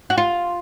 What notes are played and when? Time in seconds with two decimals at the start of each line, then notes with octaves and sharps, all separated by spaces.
0.10 F#4
0.18 F4